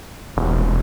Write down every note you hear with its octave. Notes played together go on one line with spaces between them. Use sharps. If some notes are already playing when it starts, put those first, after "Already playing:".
E1